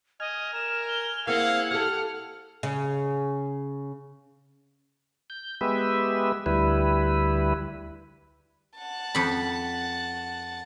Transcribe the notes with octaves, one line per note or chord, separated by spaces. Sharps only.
D#5 G#5 F6
A#4 E7
G7
A#3 C4 E4 G#4 F5 F#5
G4 A4 F6
C#3
G6
G#3 B3 G4 B4 E5
D2 G3 E4 B4
F#5 A5
F2 B5